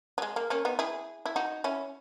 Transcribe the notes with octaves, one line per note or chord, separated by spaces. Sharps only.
F#3
G#3
A#3
A#3 C#4
B3 D#4
E4 G#4
E4
D#4 F#4
C#4 E4